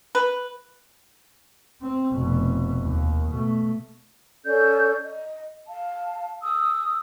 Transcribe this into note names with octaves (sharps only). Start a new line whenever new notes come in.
B4
C4
F1 B2
D#2
B2 A3
C#4 A4 D5 G6
D#5
F5 A5
D#6 E6